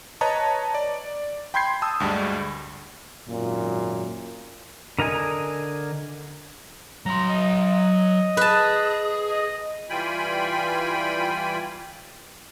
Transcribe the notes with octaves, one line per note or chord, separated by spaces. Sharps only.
B4 C#5 D#5 A5 A#5
D5
G5 B5 C6 G6 G#6 C7
A5 D#6 E6
D2 G2 G3 G#3
G#1 F#2 A#2
D3 A#4 D#5 G#5
F#3 A#5 C6
D#5
G#4 B4 A5
D#5
E3 G3 F4 G5 G#5 B5